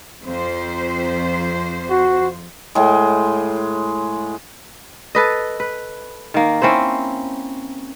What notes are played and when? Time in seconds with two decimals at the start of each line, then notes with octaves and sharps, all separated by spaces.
0.23 F2 C5
1.90 F#4
2.75 A2 G#3
5.15 A4 B4 D#5
5.60 B4
6.34 D#3 A#3
6.62 C4 C#4 E4 C5